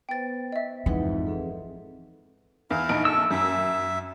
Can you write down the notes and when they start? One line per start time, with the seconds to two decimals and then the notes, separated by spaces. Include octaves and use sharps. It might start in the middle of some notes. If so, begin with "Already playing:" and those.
0.09 B3 B4 C5 G5 A6
0.52 D#5 E5
0.86 F2 G#2 E3 D#4 B4 F#5
1.27 C4 G#4 A4
2.70 E2 E4 F5
2.89 A#1 D#4 D7
3.05 A4 C#6 E6
3.31 F#2 E5